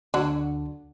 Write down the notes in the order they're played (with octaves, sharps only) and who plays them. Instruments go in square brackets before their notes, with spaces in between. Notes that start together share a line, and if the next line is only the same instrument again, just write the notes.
[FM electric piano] D2 D4 [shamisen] D3 F#3 F#4